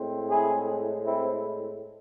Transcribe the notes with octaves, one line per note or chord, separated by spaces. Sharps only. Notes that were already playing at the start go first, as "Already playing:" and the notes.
Already playing: A2 G#3 C4
E4 G#4
C4 E4